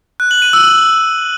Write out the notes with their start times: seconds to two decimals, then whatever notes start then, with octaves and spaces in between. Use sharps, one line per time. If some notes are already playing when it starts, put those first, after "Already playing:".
0.20 F#6
0.31 F#7
0.42 D#7
0.53 E6